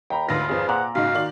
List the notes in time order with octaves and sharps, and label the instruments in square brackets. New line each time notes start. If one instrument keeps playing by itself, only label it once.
[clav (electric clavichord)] D#2 [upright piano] G5 A#5 B5
[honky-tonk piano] D2 G#2 B4 [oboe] F4 [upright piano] C6 A#6
[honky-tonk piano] G#1 F2 [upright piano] G#4 B4 C5
[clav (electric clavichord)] A#2 [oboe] F#5 [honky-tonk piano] D6
[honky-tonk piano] G#2 C#3 D#4 [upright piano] F#4 [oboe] F5
[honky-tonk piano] D#3 D5 F#7